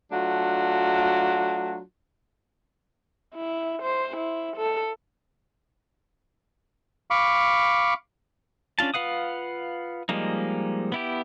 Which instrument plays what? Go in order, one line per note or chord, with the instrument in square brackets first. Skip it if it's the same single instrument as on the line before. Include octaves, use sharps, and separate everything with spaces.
[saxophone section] F#3 A3 D4 F4 F#4
[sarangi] E4
C5
E4
A4
[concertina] F5 B5 C#6 D6
[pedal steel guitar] C#4 D4 F4 A5
F4 B4 F5 F#5 D#6
F3 G3 G#3 A#3 D#4
B3 E4 G4